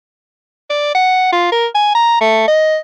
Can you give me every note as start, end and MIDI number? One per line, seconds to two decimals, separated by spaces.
0.70 0.90 74
0.95 1.28 78
1.32 1.50 65
1.52 1.67 70
1.75 1.93 80
1.95 2.18 82
2.21 2.46 57
2.48 2.77 75